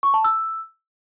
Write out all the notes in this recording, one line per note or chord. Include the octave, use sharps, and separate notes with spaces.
C#6
A5
E6